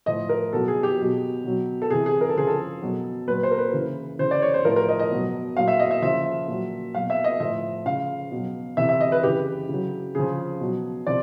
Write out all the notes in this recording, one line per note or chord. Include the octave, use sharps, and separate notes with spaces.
A2 F3 D#5
A#4
B2 F#3 A4
G#4
G4
B2 F#3
B2 F#3
A4
C3 E3 G#4
G#4
A#4
A4
C#3 F3 G#4
A4
B2 F#3
A#2 F#3 B4
C5
A#4
B4
C#3 E3
C#3 E3 C5
D5
C#5
C5
A2 F3 A#4
A#4
D#5
D#5
B2 F#3
A#2 F#3 F5
E5
D#5
E5
C#3 F3 E5
A#2 F#3
B2 F#3 F5
E5
D#5
A2 F3 E5
C#3 F3 F5
B2 F#3
C3 E3 E5
E5
D#5
B4
C#3 E3 G4
C#3 F#3
C#3 F3 G#4
B2 F#3
C3 F3 D5